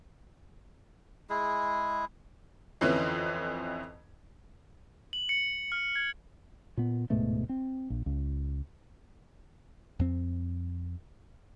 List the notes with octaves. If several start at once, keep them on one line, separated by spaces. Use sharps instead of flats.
G#3 E4 G#4
F2 D3 E3 C4 C#4
F#7
C#7
F6
G#6
A#2 B3
D1 G#2 B2 A3
C4
A#1
C#2
F2 C4